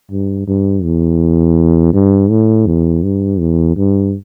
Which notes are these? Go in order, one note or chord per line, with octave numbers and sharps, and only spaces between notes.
G2
G2
E2
G2
A2
E2
G2
E2
G2